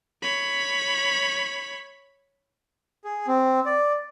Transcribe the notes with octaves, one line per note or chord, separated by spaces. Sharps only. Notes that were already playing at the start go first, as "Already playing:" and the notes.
C#5 B5
G#4
C4
D5